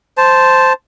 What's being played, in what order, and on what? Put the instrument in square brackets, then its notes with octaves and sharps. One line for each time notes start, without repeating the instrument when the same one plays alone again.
[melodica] C5 A5